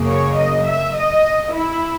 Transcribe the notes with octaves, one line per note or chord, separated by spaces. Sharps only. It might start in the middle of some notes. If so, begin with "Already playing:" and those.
Already playing: F#2 C#3 F#3 A#3
C#5
D#5
E5
D#5
E4